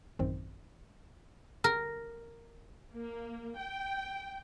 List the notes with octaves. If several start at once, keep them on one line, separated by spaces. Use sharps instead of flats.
A1 F#2 D#3 C4
A#4
A#3
G5